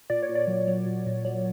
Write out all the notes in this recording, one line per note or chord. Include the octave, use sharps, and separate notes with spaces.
A#2 D5
C#5
A#2
D5
F#3
F#3
A#2
A#2
F#3